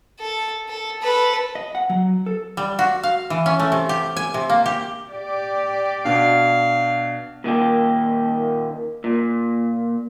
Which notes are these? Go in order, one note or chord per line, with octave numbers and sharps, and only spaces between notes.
A4
A4
A4 B4
D#5
F#5
F#3
A4
G3
F#4
F5
E3
C#4
A3
C3
G4
G#5
C3
A#3
G4
G4 D5
B2 D4 F5
A#2 D#3 A#3 G4
A#2